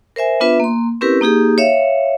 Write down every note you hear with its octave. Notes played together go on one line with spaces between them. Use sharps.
A#4 C5 E5 G#5
B3 D4 F4 B4 E5
A#3 C6
C4 C#4 E4 G4 A#4 B4
A#3 D#4 G4 G#4
C#5 E5 F5